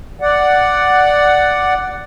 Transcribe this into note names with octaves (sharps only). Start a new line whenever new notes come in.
D5 F#5